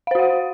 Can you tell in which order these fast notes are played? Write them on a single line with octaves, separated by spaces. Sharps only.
F5 C5 F#4 F#5